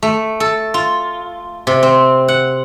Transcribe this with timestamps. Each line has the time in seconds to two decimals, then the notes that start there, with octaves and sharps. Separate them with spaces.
0.03 A3
0.40 A4
0.74 F4
1.67 C3
1.83 C4
2.28 F#5